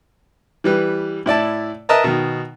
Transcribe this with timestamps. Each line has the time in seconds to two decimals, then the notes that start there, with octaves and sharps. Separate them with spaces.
0.64 E3 G3 B4
1.26 A2 E4 D5 A5
1.89 A#4 B4 D#5 E5 A5 A#5
2.04 B2 D#3